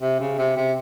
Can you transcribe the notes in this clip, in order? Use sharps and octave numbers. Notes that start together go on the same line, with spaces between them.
C3
C#3
C3
C3